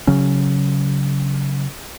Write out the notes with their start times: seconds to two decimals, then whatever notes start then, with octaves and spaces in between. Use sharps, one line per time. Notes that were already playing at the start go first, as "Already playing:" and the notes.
0.07 C#3 F#3 C#4